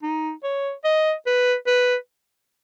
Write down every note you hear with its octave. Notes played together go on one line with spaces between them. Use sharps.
D#4
C#5
D#5
B4
B4